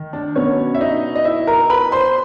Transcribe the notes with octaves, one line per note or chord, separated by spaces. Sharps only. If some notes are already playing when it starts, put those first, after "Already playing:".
Already playing: D#3
D4 D5
B2 F#3 B3 C#4 C#5
E5
D#4 D#5
D#5
E4 E5
A#4 A#5
B4 B5
C5 C6